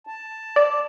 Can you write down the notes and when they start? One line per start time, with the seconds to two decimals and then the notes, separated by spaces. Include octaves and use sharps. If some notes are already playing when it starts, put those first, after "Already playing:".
0.07 A5
0.56 D5